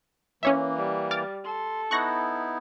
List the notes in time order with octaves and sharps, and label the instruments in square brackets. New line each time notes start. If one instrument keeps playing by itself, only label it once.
[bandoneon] E3 A#3 [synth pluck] C#4 C#5 E5
[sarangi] G3
[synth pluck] D6 F6 A6
[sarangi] A4 [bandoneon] C6
[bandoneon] B3 D#4 E4 [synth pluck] C#6 F#6 A#6